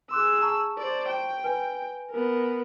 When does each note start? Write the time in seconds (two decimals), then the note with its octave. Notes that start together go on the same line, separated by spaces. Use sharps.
0.11 G#4 C6 D6 E6 F#6
0.42 A5 A#5 C#6
0.78 C5 D5
1.08 G5
1.44 B4 G#5
2.11 B3 A#4